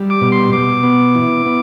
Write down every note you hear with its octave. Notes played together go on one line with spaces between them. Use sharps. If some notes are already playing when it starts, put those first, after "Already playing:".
Already playing: G3
D6
B2
C6
B2 D6
B3
E3
B3